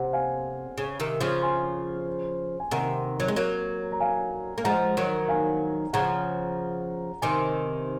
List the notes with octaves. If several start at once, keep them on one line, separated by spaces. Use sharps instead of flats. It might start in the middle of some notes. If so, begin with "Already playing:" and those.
Already playing: C3 F#5
F5 G#5
C#3
C3 D#3
C#3 F3
G#5 C6
G#5
C3 D#3 F#5 A#5
F#3
G#3
F#3 A#3
A#5
F5 G#5
A#3
F3 G#3 F#5 A#5
D#3 F#3
F5 G#5
C#3 F3 F#5 A#5
C3 D#3 G#5 C6